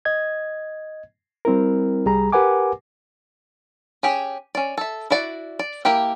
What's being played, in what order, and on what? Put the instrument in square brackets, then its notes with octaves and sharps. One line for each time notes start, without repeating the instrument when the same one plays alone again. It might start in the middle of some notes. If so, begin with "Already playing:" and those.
[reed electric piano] D#5 G#6
G3 C4 E4 A#4
C2 G3 G#4 A#5
G4 A#4 B4 F#5 G#5 D6
[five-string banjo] C#4 G4 G#4
C#4 D5
A4 E5
E4 F#4 D5 F#5
D5
A#3 E4 G4 G5